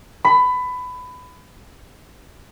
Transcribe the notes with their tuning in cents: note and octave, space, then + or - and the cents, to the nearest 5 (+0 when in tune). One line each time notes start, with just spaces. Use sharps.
B5 +20